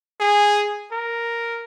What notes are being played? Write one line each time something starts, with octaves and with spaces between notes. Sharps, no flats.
G#4
A#4